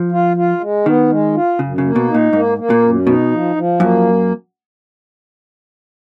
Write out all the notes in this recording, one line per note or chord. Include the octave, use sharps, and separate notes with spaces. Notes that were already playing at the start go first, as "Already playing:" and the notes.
Already playing: F3
F4
F4
G#3
D#3 B3
G#3
F4
F#2 C#3
C#3
A#3
B2
D#4
A#2
G#2 A#3
A#3
A#2
F#2
B2 D#4
F3
F3
F#2 A#3